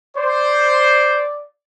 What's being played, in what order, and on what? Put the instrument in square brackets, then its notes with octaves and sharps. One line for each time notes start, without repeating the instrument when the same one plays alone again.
[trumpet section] C5 [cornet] D5